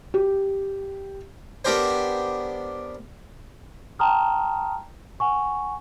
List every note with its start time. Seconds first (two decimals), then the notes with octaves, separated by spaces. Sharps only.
0.14 G4
1.65 B3 D4 G4 A#4 C5
3.99 G5 A5 A#5 C6 D#6 F6
5.20 F#5 G#5 C#6